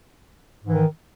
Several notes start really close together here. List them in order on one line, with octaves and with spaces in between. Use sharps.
G#2 E3 D#3